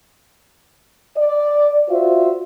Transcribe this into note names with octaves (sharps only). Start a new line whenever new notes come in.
D5
F4 F#4 C5 D5 E5